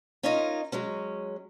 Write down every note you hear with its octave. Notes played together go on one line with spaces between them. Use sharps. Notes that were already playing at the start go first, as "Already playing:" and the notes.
C#4 D#4 F4 A#4 D#5
F#3 G#3 C#4